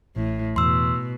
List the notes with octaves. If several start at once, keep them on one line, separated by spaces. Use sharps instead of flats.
A1 A2
E2 B2 C6 E6